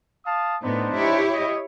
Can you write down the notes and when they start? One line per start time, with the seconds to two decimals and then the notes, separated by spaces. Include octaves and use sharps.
0.25 F5 A5 D#6
0.62 A2 B3 D4 D#4 C5
0.95 E4 G4 C#5
1.34 D#5